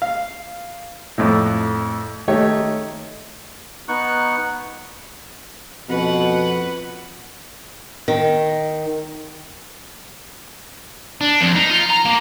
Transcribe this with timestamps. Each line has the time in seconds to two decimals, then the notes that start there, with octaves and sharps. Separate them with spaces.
0.02 F5
1.18 F2 A2
2.28 D#3 A3 D#4 G4 C#5
3.88 B3 D#4 C#6 F#6
5.89 F2 B2 B4 F#5
8.08 D#3
11.21 D4
11.41 F2
11.56 D#4
11.70 F4
11.90 A#5
12.05 A#3